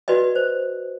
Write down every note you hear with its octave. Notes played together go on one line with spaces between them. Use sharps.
F#4 B4 D5 D#5
C5